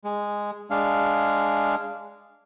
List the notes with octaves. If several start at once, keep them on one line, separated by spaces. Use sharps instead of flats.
G#3
G#3 D4 F5